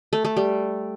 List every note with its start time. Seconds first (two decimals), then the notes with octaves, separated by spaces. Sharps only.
0.13 A3
0.25 A3
0.37 G3